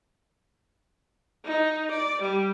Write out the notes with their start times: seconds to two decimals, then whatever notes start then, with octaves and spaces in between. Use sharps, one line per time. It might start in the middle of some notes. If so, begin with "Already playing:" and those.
1.45 D#4
1.92 D5
2.22 G3